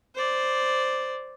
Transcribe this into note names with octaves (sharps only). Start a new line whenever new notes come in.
C5 D5